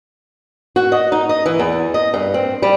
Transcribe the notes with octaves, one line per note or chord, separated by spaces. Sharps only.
F#4
D#5
D#4
D#5
E3
E2
D#5
G2
C4
G3